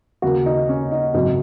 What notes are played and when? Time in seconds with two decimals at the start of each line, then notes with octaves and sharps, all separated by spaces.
0.22 D#2 C#3 A#3 F#4
0.46 D#4
0.69 C#4
0.92 D#4
1.14 G#1 F#2 C#3 F#3 D#4